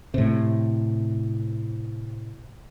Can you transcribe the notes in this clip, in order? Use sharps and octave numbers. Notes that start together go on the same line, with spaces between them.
A2 C3